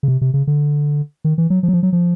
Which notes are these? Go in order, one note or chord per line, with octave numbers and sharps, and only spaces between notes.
C#3
C3
C3
C#3
D3
D#3
E3
F#3
F3
F#3
F3
F#3
F3